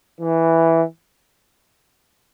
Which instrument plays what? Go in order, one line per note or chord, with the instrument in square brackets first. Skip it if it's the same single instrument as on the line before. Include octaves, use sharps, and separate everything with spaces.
[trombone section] E3